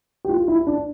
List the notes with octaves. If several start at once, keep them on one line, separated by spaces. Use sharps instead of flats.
G4
F4
E4
D4